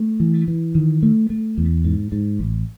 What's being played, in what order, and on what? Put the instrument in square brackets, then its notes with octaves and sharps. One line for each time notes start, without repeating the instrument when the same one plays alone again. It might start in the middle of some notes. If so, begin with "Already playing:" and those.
Already playing: [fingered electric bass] A3
E3
E3
D#3
A3
A3
E2
G#2
G#2
A1